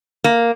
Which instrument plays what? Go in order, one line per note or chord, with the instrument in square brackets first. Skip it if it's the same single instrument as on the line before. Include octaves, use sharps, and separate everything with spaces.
[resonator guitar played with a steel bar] A#3